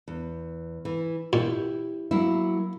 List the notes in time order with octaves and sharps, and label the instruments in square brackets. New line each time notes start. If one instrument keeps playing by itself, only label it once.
[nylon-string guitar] E2
E3
[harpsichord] A#2 [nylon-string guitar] E4 G4
[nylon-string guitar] F#3 A#3 E4